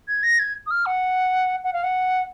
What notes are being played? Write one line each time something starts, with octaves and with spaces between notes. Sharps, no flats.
G#6
A#6
G#6
D#6
F6
F#5
F#5
F5
F#5